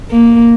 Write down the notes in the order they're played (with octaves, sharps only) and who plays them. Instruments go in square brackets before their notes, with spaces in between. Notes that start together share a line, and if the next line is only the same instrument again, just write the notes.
[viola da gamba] A#3